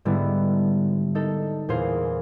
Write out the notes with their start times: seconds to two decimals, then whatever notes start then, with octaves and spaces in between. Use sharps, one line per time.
0.05 G#2 D3 G3 B3 E4
1.15 D#4 A4
1.69 E2 A#2 G#4 C5 F5 C7